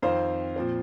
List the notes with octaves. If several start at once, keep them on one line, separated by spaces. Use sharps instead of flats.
F2 D#3 C4 C5 F5
A#2 F3 C4